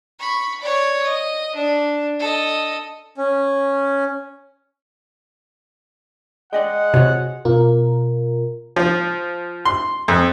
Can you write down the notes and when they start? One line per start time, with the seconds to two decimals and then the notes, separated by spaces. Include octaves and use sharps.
0.19 B5 C#6
0.60 C#5 D5
1.02 D#5
1.55 D4
2.19 A4 D#5
3.18 C#4
6.53 G#3 D5 D#5 F#5 G5
6.94 C3 F4 F#4 C#5
7.45 B2 F4 A#4
8.76 F3
9.65 C6
10.08 F2